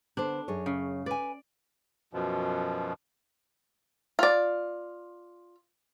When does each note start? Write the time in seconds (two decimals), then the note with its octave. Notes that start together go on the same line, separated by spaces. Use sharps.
0.17 D3 B3 D4 C5
0.48 F#2 G#4 C#5
0.66 C#3
1.06 B4 D5 G#5
2.13 F#2 B2 F3
4.19 F4 D5